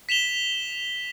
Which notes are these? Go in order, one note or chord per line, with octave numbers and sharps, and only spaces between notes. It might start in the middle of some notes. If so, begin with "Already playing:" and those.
B6 E7 F7 G7